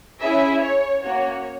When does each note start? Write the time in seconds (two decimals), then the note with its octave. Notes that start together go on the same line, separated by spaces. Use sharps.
0.20 C#4 E4 G#4 E5
0.61 C#5
1.02 A#3 C#4 F#4 C#5